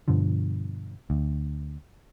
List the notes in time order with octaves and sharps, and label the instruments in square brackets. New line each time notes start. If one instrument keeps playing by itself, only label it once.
[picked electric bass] G2 B2 D3 F3
D2